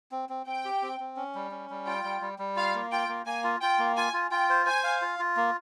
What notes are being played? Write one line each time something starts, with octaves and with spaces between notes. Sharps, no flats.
C4
C4
C4 G5
G4
C4
C4
C#4
G3
C#4
G3
F4 G5
G3
G3
G3
F4 F5
A#3
F4 G5
A#3
A#3 G#5
F4
F4 G5
A#3
F4 G#5
F4
F4 G5
C5
C5 G#5
F5
F4
F4
A#3